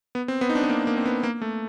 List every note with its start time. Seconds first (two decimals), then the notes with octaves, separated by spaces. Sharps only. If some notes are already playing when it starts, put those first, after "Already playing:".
0.15 B3
0.28 C4
0.41 B3
0.49 D#4
0.55 D4
0.64 B3
0.69 A#3
0.87 A#3
0.97 C4
1.06 B3
1.23 A#3
1.42 A3